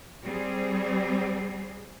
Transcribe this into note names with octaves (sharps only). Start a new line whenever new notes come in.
G3 C4 G#4